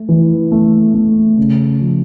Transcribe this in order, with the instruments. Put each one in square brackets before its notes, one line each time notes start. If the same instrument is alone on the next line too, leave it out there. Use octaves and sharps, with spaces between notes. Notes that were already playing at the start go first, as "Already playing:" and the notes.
Already playing: [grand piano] A3
E3
A3
A3
C#3
F3